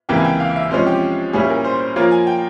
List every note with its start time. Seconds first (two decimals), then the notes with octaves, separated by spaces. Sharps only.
0.09 C#2 C3 E3 A#3 E4 G5
0.17 G#5
0.24 G5
0.40 F5
0.56 E5
0.71 C3 F3 G#3 C#4 C5
0.86 G4
1.33 A#2 G3 C#4 E4 G#4
1.44 G#4
1.49 A#4
1.64 C5
1.80 C5
1.96 F3 A#3 F4 A#4 C#5
2.11 G#5
2.27 G5